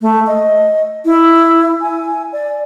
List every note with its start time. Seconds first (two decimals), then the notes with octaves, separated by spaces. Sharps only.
0.02 A3
0.27 D#5
1.05 E4
1.81 G#5
2.33 D5